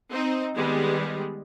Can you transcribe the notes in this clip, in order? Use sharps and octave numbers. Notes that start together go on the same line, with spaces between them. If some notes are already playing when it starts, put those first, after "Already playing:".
C4 D#4
D#3 G3 G#3 B3